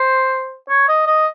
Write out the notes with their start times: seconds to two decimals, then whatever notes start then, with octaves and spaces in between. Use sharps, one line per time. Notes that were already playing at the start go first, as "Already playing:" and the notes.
Already playing: C5
0.69 C#5
0.89 D#5
1.07 D#5